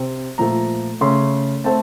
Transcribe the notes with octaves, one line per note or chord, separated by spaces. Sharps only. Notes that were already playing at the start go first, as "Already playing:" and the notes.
Already playing: C3 C4
A#2 F3 A3 A#5
C#3 A3 C#4 C6
A3 C4 A5